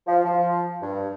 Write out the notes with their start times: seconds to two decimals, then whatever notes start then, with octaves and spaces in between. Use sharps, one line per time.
0.07 F3
0.24 F3
0.81 G2